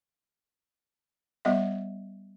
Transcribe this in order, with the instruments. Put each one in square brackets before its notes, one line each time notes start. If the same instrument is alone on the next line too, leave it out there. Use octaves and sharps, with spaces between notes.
[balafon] G3 B3 D#5 E5